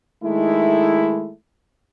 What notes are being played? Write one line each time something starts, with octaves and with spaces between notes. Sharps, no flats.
D#3 G#3 A3 D#4 E4